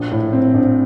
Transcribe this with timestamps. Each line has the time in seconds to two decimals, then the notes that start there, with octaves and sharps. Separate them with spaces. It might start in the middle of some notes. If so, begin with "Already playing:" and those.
Already playing: A#1
0.12 A2
0.33 C4
0.54 A#1